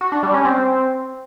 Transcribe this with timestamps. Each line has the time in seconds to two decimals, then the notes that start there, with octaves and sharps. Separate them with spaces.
0.01 F#4
0.12 D4
0.23 G3
0.34 C#4
0.45 C4